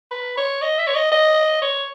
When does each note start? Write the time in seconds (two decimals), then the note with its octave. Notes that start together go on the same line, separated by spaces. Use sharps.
0.11 B4
0.37 C#5
0.62 D#5
0.78 E5
0.87 C#5
0.95 D#5
1.12 D#5
1.62 C#5